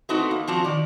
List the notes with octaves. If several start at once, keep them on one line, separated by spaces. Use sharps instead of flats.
A3 B3 C4 D#4 F#4 A4
A#3
A#2 F3 C4 F#4 A5 A#5
D#3 D5